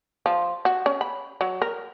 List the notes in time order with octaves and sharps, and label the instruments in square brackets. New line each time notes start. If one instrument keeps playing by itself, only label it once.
[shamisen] F3
F#4
C#4
B5
F#3
A#4